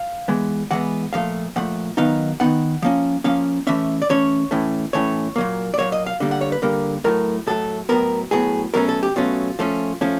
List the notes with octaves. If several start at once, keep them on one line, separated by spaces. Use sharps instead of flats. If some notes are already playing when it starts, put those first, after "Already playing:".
Already playing: F5
E3 G#3 B3
E3 G#3 B3 F#5
A#2 F3 A3 F5
A#2 F3 A3 F#5
D#3 F#3 B3 D#4 F5
D#3 F#3 B3 D#4 F#5
F3 A#3 C#4
F3 A#3 C#4 F5
E3 A3 C#4 E5
D5
E3 A3 C#4 C#5
A2 E3 A3 C#4
A2 E3 A3 C#4 C#5
A#2 F#3 A#3
D5
A#2 F#3 A#3 C#5
D#5
F5
D3 G3 A#3
F#5
C#5
B4
D3 G3 A#3 A#4
A2 F#3 A3 A#4
A2 F#3 A3 A4
A2 F#3 B3 A#4
A2 F#3 B3 G#4
B2 F#3 A3 C#4 A#4
A4
G4
B2 F#3 A3 C#4 F4
F3 A3 C#4
F3 A3 C#4